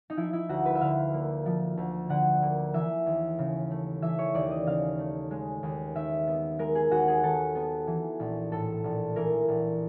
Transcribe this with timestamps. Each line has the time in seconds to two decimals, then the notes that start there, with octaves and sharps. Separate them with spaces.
0.10 D#4
0.17 F3 E4
0.33 E4
0.49 D2 F#4
0.65 B4
0.75 E5
0.81 D3 F5
1.14 A#3
1.46 F3
1.77 D2
2.09 D3 F#5
2.42 A#3
2.74 E3 E5
3.06 D#2
3.39 C#3
3.71 A3
4.02 E3 E5
4.19 C#5
4.34 D#2 D5
4.51 D#5
4.66 C#3 F5
4.99 A3
5.31 G#3
5.63 D#2
5.95 D#3 E5
6.27 B3
6.59 G#3 A#4
6.75 G#4
6.91 D#2 F#4
7.08 G#4
7.23 D#3 A4
7.55 B3
7.87 E3
8.20 A#1
8.52 A2 A4
8.84 A#1
9.16 E3 A#4
9.48 A#1